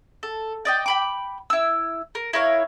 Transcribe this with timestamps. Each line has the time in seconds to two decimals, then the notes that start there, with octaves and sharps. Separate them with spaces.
0.23 A4
0.65 D5 D#5 G5
0.86 G5 B5 D6
1.50 E4 E6
2.15 A#4
2.33 E4 A#4 C#5 F5